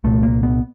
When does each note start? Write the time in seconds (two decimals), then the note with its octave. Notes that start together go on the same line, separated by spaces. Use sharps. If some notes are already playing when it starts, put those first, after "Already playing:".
0.04 C2 A#2 A3
0.23 A#3
0.43 B3